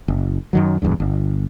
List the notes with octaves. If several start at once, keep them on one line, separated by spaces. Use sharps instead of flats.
F#1
F#2 D#3 F#3
D1 G#1 E2 G2
G1